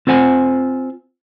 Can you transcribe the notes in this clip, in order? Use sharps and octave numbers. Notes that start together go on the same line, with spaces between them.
C4 F4 C5 F#5 G#5